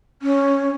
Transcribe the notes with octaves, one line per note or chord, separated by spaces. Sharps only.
C#4